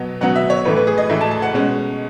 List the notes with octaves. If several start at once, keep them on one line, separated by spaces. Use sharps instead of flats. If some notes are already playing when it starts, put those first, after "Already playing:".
Already playing: B2 F#3 B3
B2 F#3 B3 F#5
E5
C#5
A2 E3 A3 B4
B4
G#4
D#5
A2 E3 A3 E5
A5
A5
F#5
B2 G#3 C#4